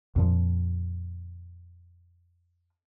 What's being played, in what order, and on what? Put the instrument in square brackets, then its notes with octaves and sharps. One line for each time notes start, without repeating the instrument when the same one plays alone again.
[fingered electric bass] F2 A#2 F3